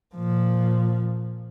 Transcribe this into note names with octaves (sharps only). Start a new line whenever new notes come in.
A#2 F3